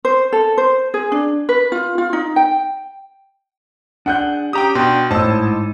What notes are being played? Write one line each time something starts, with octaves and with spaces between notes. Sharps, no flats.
C5
A4
C5
G#4
D4
B4
F4
F4
D#4
G5
D4 G#4 D5 F#5 F#6 G6
C#4 G4 G5 A#5 D#6
B2 D4 G5 C6 F#6
A1 G#2 D#4 E4 C5 A5 E6